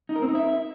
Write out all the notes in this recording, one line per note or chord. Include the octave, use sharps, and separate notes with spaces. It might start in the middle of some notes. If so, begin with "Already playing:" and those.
D#4
A#4
C4
D#4
E5